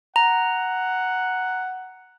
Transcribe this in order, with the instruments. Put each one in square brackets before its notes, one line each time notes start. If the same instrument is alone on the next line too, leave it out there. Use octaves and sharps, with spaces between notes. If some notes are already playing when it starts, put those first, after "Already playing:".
[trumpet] F#5 [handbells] A#5